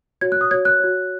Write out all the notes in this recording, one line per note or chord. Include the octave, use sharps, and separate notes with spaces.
F#4 C#5 G#6
F#6
D#6
F#4 C#5 G#6
F#6
F#4 C#5